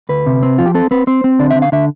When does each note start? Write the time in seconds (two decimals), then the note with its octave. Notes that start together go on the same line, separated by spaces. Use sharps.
0.09 D2 B4
0.26 C3
0.43 C4
0.58 F3 F4
0.66 G4
0.74 C4 A4
0.91 C4 B4
1.07 C4 C5
1.24 C4
1.39 D3 D5
1.51 E5
1.55 D3
1.62 F5
1.72 D3 E5